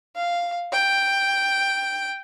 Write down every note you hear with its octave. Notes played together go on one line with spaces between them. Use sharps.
F5
G5